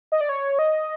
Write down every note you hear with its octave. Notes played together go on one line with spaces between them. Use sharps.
D#5
D5
C#5
D#5